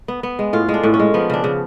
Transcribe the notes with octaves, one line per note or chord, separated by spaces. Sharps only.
B3
B3
G#3
A2 F4
G#3
D4
A2
C#4
G#3
F3 B3
C#3 D4
C#3